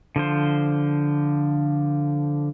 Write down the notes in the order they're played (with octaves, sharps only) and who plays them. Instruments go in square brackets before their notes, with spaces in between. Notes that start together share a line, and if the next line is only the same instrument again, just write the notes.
[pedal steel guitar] D3 F3 C5